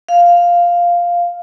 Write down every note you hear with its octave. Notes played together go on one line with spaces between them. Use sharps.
F5